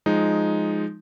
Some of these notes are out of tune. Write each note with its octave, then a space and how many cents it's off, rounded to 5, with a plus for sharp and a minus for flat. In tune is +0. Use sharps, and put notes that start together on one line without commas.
F3 +0 G#3 +0 D#4 +0